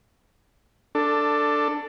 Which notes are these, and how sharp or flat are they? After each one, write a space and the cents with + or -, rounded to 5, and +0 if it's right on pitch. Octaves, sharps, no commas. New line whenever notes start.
D4 +0 A4 +15